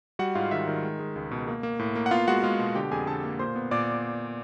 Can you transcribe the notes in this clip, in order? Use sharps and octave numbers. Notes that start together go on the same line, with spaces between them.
G3 F#4 F#5
G#2 F4 F5
D#3 E5
D#3
G#3
G#3
C#2
B2
A#3
A#3
A2
A#3
F#5
B3 F4 F5
G#3 F#4 F#5
G#3 F4 F5
B2
D3 G4 G5
F2 G#4 G#5
D3 A4 A5
A#3
A#2 C5 C6
B3
A#2 D5 D6